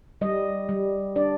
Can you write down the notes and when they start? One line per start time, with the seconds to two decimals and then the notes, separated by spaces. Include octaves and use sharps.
0.21 G3 D#5
0.69 G3
1.16 D4 D5